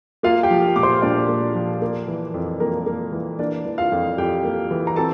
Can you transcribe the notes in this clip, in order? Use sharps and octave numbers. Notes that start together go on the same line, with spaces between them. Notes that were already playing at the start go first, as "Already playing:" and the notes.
A#3 F4 F5
G4 G5
F3
A#2 D6
C5 C6
A#2 D4 D5
A#3
F3
A#3
E3
F2
F2 A#3 A#4
A#3
E3
A#3 D4 D5
E3
F4 F5
F2
F2 G4 G5
A#3
E3
A#5
C4 A4 A5